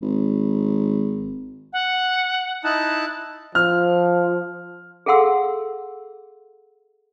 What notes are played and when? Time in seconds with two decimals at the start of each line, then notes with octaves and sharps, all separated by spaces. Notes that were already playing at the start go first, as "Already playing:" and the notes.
0.02 G#1
1.73 F#5
2.64 D#4 E4 A5 F#6
3.55 F3 F6
5.06 G#4 A4 F5 F#5 C6 E6